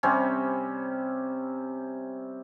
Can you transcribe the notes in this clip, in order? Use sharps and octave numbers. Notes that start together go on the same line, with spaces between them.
C3 G3 C4 C#4